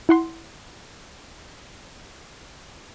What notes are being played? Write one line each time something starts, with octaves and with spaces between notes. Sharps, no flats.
E4 F#5 C6